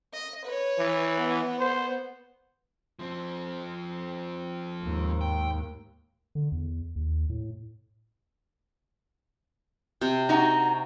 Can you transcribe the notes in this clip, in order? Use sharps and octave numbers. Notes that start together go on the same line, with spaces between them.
D#5
B4 C#5
E3
B3
C5
F3 C4
D#2 G#2
G5
D3
E2
D#2
A2
C3
D#4 F#4